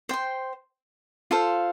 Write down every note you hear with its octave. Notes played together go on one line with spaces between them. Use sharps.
C5 G5 C6
F4 A4 C5 F5